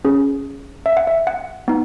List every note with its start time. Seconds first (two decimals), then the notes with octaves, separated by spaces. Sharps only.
0.05 C#4 G#4
0.86 E5
0.97 F#5
1.07 E5
1.27 F#5
1.68 B3 D#4